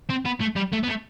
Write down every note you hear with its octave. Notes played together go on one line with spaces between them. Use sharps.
C4
B3
A3
G3
A3
B3
A3